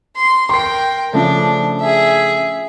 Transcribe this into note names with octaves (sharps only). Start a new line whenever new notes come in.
C6
A#4 G5 C6 C7
C#3 F3 A3 D4
G#4 E5